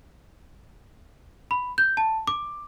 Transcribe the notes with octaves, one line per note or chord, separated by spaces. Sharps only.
B5
G6
A5
D6